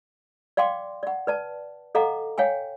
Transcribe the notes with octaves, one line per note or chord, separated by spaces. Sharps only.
D5 F5 G5 C6 D6
D5 F#5
B4 D5 A5
A4 D#5 F5 F#5 A#5 D6
C#5 F5 G5 G#5